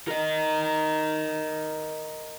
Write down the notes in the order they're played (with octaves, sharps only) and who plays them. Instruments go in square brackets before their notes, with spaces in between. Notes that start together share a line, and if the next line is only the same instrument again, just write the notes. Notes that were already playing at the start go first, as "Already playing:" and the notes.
[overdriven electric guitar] A#4 D#5